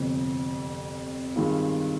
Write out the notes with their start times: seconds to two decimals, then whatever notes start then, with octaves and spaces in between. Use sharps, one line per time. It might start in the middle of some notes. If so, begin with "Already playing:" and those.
Already playing: G1 F2 C3
1.35 G2 D#3 G#3 C4 F4